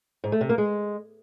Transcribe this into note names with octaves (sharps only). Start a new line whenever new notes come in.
G#2
A3
C3
A#3
G#3